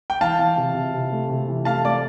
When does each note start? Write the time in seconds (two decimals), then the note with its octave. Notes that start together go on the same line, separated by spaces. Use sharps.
0.10 G5
0.21 E3 F5 A5
0.39 E3
0.58 C3
0.75 C3
0.94 C3
1.12 A3
1.29 C3
1.48 E3
1.65 A3 F5 A5
1.85 A3 D5